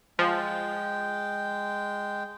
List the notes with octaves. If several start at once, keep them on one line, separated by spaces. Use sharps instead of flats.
F3 G#3 G5